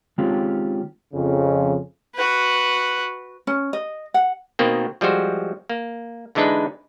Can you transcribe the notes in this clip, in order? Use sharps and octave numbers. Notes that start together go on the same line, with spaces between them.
D#3 G#3 C4 C#4 F4 G4
F2 C#3
F#4 B4
C#4
D#5
F#5
B2 D#3 A#3 C4
F3 G3 G#3 F#4 C5
A#3
D3 E3 G#3 D4 D#4 B4